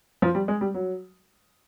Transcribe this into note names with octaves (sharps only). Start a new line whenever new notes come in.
F3
G3
G#3
G3
F#3